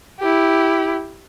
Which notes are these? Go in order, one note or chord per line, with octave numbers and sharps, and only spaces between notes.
E4 G4